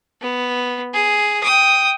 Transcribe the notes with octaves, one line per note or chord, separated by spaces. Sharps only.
B3
G#4
G5 D#6